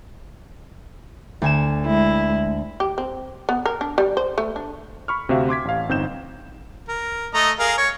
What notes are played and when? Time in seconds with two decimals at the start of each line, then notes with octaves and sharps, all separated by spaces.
1.42 D2 G#5 E7
1.85 G#3 E4
2.80 G4
2.98 C4
3.49 B3
3.66 A#4
3.81 D4
3.98 G3
4.17 C5
4.38 A3
4.56 D4
5.08 B5 C#6 F6
5.29 D2 C3 C4 F#4 E5 F5
5.49 C6 D6 G#6 B6
5.65 A1 F5
5.89 G1 C4 D#4 G6 E7
6.89 A#4
7.34 A3 D#5 A#5
7.59 G#4 A#4 F5
7.78 C#5